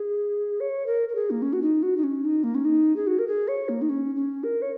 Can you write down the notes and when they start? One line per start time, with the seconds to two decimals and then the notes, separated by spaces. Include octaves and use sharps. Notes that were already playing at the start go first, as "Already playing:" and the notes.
Already playing: G#4
0.60 C#5
0.86 A#4
1.09 A#4
1.15 G#4
1.30 A#3
1.42 C#4
1.53 F#4
1.62 D#4
1.82 F#4
1.97 D#4
2.03 C#4
2.25 D#4
2.44 A#3
2.55 C#4
2.65 D#4
2.96 G#4
3.07 F#4
3.19 A#4
3.27 G#4
3.48 C#5
3.69 A#3
3.82 D#4
3.89 C#4
4.16 C#4
4.44 A#4
4.62 C#5